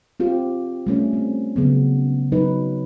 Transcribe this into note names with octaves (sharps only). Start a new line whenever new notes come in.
C4 F4 G4
G3 A3 C#4
C4
C#3 F#3 B3
F#3 D#4 B4